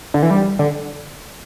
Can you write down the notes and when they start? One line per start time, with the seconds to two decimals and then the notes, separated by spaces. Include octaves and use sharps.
0.14 D3
0.23 E3
0.31 G3
0.59 D3